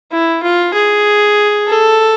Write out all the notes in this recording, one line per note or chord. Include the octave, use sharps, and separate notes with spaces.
E4
F4
G#4
A4